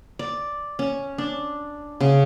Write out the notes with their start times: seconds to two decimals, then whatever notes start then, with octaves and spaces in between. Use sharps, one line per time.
0.19 D5
0.79 C#4
1.18 D4
2.01 C#3